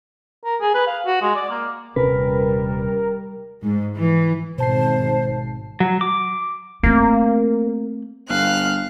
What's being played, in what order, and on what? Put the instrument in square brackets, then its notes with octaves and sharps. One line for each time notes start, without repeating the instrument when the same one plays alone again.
[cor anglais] A#4
G#4
B4
F5
F#4
G#3
D5
A#3
[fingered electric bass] D#1 C3 C#4 [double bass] G3 [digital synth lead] A#4 [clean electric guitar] B4
[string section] G#2
E3
[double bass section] G#1 [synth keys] B2 A5 C7 [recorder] C5
[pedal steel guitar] F#3
D6
[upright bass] A3 C4 [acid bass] A#3
[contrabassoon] G1 [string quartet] F5 F6 F#6